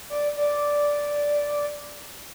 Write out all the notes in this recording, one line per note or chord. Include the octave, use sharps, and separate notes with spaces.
D5
D5